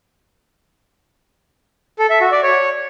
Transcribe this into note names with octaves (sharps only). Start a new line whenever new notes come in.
A4
E5
F#4
D5
C#5